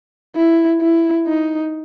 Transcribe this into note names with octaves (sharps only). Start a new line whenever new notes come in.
E4
E4
D#4